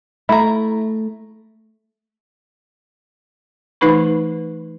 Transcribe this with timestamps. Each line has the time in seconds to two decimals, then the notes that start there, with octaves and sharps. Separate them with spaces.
0.29 A3 E4 A#5
3.81 E3 A3 D#4 B4 B5 C#6